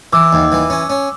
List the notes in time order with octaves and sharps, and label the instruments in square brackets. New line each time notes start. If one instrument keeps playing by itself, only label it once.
[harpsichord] E3 [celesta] D6 E6
[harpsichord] D#2
E3
C#4
C#4